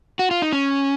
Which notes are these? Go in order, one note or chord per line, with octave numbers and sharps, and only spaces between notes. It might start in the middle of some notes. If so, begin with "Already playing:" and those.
F#4
F4
D#4
C#4